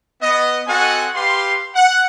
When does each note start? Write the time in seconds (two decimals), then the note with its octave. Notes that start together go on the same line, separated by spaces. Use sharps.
0.22 B3 D#5
0.67 C4 F#4 A4 D#5 F#5 G#5
1.14 G4 B4 F5 C6
1.75 F#5